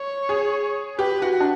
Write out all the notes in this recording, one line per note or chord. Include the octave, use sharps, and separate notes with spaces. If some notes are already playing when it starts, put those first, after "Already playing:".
Already playing: C#5
G#4
G4 B4
F#4
D4